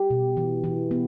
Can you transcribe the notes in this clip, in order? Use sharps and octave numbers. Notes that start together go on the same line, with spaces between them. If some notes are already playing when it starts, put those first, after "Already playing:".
Already playing: G4
B2
E3
E3
B3